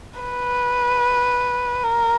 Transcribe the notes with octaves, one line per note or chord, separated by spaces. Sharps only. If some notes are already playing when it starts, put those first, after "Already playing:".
B4
A#4